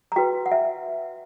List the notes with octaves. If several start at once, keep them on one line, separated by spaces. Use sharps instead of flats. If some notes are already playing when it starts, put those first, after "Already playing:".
A#5
F#4 B4 G5
F#5
E5